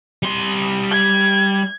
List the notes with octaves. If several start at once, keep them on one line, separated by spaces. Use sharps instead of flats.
G3 C6
G#6